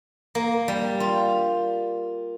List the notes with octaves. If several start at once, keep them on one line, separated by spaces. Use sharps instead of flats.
A#3
G3
F4